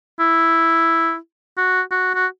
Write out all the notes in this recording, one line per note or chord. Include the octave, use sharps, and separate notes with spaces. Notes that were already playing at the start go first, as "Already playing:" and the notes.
E4
F#4
F#4
F#4